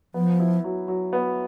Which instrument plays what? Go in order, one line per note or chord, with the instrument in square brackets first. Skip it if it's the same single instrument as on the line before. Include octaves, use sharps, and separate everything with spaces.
[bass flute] F3 [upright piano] B3
[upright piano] E4
F#3
F#3
B3